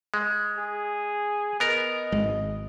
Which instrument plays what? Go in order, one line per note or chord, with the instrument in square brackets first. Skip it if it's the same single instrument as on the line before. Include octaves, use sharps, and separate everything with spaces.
[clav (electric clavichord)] G#3
[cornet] G#4
[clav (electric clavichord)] B3 A#4 [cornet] D#5
[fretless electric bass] G#1 G#3